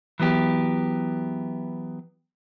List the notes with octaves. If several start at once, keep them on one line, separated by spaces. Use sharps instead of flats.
E3 F#3 B3 G4